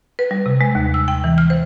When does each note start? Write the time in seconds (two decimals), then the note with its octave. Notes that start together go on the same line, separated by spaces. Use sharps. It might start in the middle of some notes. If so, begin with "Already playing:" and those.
0.19 B4
0.31 G3
0.46 C3
0.61 G#3
0.75 D#2
0.94 E6
1.08 G5
1.24 E3
1.38 F6
1.50 C5